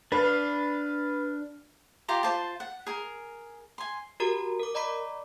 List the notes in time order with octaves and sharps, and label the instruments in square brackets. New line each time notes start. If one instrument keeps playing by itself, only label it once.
[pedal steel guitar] D4 F5 [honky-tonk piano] B4
[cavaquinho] F4 G4 A#5 C6
F4 C5 A5
F#5
G#4 A#4
G#5 C6
[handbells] F#4 G4 A#4 A#5
A#4 D6
D5 D#5 A#5 B5 D6 B6